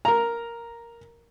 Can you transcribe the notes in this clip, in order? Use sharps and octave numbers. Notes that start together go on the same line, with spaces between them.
A#4 A#5